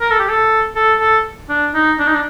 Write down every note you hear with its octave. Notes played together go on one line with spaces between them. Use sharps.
A#4
A4
G4
A4
A4
A4
D4
D#4
D4
D#4
D4